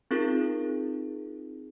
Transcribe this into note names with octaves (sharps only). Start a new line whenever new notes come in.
C4 D#4 F4 G#4 A#4